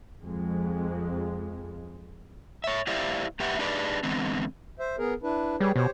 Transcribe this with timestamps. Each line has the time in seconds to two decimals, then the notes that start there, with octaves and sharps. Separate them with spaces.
0.21 F2 G#3
2.64 C#5 E5
2.87 E4 G4 C5 D5 E5 F5
3.40 A2 G4 B4 E5 F#5
3.59 D4 D#4 G4 G#4 B4 D5
4.03 D3 E3 G#3 B3 C4
4.80 C5 E5
4.98 B3 G#4 A#4
5.23 D4 E4 B4
5.60 G3 G#4 B4 C#5
5.76 B2 G4 C5 C#5